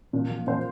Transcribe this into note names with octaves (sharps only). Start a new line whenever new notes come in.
A#2
F3
A#2 C5